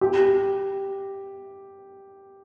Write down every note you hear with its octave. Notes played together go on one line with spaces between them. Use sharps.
G4